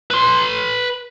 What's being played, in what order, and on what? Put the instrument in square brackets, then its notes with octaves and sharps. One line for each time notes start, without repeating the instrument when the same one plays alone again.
[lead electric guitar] B4 C6